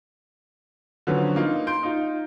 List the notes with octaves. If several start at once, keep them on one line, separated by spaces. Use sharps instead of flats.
D3 F3 F#3 B3 C#4
A#3 D#4 F4
C6 G6 D7
D#4 F4